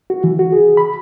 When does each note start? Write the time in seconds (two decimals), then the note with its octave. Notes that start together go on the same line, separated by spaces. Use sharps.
0.10 F#4
0.24 E3
0.39 F#4
0.52 G#4
0.77 B5